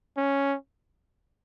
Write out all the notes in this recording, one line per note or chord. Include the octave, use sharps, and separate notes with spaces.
C#4